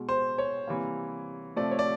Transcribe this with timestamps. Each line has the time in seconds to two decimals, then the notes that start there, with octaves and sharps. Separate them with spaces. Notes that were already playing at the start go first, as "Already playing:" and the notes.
Already playing: B2 G#3
0.09 C5
0.38 C#5
0.68 C3 E3 G3 A#3
1.56 C3 F3 A3 D5
1.71 C#5
1.79 D5